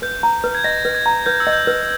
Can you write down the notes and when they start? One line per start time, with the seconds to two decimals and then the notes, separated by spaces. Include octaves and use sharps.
0.02 B4 G6
0.23 A#5
0.44 B4
0.55 G#6
0.64 D#5 A#6
0.85 B4
0.95 G#6
1.06 A#5
1.26 B4 G6
1.40 E6
1.47 D#5
1.53 G6
1.67 B4